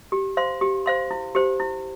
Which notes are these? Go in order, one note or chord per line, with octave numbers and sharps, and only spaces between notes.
G4
C5 F5 C6
G4
C5 F5 C6
E4
G4 C5
E4